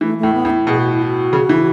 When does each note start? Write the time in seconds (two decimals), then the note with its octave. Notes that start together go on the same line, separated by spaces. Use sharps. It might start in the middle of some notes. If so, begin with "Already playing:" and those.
0.01 E3 A3
0.18 A3
0.23 A2
0.34 B3
0.45 A2
0.50 E4
0.67 B2 G#4
0.79 F#4
0.91 E4
1.02 F#4
1.33 C#3
1.49 E3